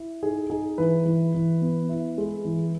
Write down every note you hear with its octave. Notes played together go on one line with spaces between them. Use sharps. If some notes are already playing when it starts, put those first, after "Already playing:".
Already playing: E4
D#4 G#4
D#4 G#4
E3 B4
E3
E3
B3
E4
G#3
E3